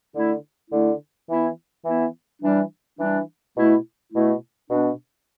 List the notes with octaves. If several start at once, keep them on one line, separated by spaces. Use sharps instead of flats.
D3 A3 E4
D3 A3 E4
E3 B3 E4
E3 B3 E4
E3 G3 D4
E3 G3 D4
B2 A3 E4
B2 A3 E4
B2 B3 D4